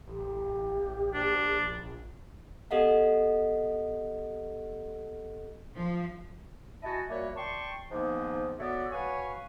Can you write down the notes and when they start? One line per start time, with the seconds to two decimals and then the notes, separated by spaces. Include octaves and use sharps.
0.07 A1 G4
1.14 A#1 D4
2.71 B3 G4 A4 D#5 F5 F#5
5.75 F3
6.83 E4 F#4 D#5 G#5 A5
7.09 A#2 G3 A#3 F#4 C#5 E5
7.36 D5 G5 A5 C6 C#6
7.91 G#2 D#3 F3 A#3 B3 D#4
8.59 A3 B3 F#4 C#5 D5 E6
8.92 F#4 B4 C#5 F5 G#5 C#6